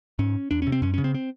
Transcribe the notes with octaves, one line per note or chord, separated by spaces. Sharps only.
G#2 C#4
E2 D4
C#4
C3
C4
F#2 C#4
C#3 C#4
C4
C4